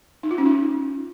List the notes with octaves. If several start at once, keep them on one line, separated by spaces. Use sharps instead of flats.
D#4
F4
C#4
D#4